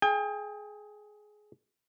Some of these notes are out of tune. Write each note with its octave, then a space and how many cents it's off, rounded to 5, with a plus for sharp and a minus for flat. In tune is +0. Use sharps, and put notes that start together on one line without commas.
G#4 +20 G5 +40